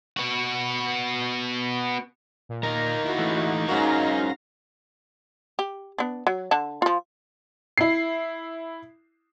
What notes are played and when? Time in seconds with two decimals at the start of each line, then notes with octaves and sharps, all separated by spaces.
0.17 B3 F#4
2.49 A#2
2.63 D#4 G4 A#4
3.04 E4 F#4
3.19 E3 A3
3.68 G#2 C#4 F#4 A#4 F5 A#6
5.59 G4
5.98 B3 D4
6.27 F#3
6.51 D3 A5
6.82 F3 F4
7.78 E4 C7